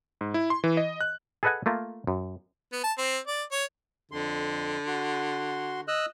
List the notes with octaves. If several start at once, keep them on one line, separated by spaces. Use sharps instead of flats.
G#2
E4
C6
E3
D#5
F#6
G#4 A4 B4 D#5 F#5 G#5
A3 A#3 F4
F#2
B3
A5
C4
D5
C#5
F2 D3 C6
F#4 C6
D#5 E6 F#6